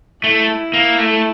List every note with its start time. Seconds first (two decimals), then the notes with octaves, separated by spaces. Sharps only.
0.24 A3 E4
0.73 A#3
0.98 A3